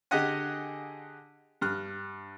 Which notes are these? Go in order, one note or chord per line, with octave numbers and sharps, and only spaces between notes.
D3 G4 G#4 D#5 F#5 G#5
G2 F6 F#6